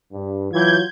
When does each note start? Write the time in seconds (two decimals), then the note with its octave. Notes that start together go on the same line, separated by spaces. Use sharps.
0.13 G2
0.53 E3 F#3 F4 G6 G#6